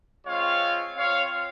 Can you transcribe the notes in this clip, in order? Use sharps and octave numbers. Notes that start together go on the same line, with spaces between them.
G#3 C4 F4 C#5 F5
C4 F4 C#5 F5